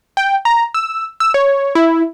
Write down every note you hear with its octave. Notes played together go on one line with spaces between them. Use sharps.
G5
A#5
E6
E6
C#5
E4